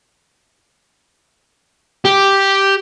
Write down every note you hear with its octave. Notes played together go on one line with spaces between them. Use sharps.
G4